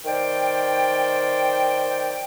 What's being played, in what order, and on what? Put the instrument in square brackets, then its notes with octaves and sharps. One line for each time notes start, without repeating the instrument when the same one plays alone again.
[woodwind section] D#3 C5 D5 G5